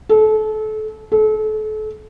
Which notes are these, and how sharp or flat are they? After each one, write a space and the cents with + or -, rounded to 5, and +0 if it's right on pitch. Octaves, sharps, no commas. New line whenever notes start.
A4 -30
A4 -35